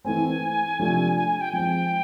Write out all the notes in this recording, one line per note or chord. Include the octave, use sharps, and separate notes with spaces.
E3 A3 C4 G#5
C3 F3 A3 D4 F4
G#5
G#5
G5
F3 G#3 C4 G5